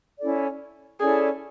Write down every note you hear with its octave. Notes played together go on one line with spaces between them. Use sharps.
C#4 E4 A4 D5
C#4 E4 G#4 A4 D5